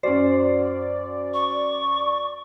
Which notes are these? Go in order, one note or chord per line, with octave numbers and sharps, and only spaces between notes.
F#2 C#4 F#4 C5 D5
C#6